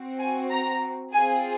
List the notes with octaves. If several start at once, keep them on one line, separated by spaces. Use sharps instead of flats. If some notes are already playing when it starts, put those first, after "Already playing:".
Already playing: C4 F#4
G#5
A#5
C4 F4 G#4 G#5